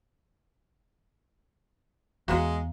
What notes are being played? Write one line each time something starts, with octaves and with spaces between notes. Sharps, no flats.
E2 G#3 F#4 B4 F5 A#5 E7